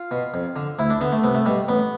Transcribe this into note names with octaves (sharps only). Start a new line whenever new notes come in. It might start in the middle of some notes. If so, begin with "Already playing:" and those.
Already playing: F4
B2
F2
D3
D2 E4
D4
D3 B3
A3
C2 B3
A3
B2 G3
A1 B3